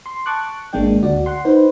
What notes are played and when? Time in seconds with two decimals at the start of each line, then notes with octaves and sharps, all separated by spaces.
0.06 C6
0.26 A5 C#6 D6 F#6
0.73 G#1 G#3 A#3 D4 D5 G5
1.03 D2 F#4 D5
1.26 F#5 C6
1.45 D#4 B4 C5